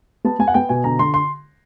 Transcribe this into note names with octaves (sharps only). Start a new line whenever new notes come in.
B3 A5
B3 G#5
F#5
B3 G5
B2 G#5
D3 A#5
D3 C6
C6